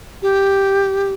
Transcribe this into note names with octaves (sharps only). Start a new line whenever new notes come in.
G4